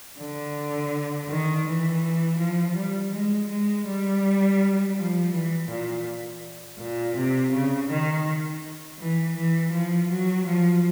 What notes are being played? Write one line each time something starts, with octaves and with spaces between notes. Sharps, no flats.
D3
D#3
E3
F3
G3
G#3
G#3
G3
F3
E3
A#2
A#2
C3
C#3
D#3
E3
E3
F3
F#3
F3